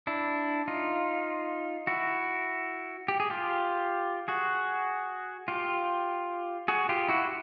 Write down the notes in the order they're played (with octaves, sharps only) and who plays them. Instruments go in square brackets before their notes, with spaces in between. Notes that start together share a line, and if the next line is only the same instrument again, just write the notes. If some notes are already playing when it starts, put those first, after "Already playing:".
[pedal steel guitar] D4 E4
D#4 F4
E4 F#4
G4
G#4
F4 G4
F#4 G#4
F4 G4
F#4 G#4
F4 G4
E4 F#4